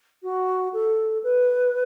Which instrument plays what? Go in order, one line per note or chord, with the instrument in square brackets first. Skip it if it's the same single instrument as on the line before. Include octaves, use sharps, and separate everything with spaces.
[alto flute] F#4
A4
B4